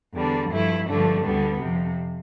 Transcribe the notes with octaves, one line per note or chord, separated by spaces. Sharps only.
E2 D3 G3 D4
G2 F3 A3 E4
G2 D3 F3 A3 D4
D2 D3 G3 B3
F2 C3 F3